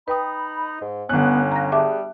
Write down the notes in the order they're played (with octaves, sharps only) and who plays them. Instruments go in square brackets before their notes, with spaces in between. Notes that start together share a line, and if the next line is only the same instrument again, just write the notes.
[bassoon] D#4 [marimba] B4 G5 D#6 [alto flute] B5
[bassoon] G#2
[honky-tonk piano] G1 F#6 [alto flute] B3 [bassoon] C#4
[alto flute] F5 [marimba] A#5 A#6
[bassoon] G3 [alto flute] G#4 [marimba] E5 A5 D6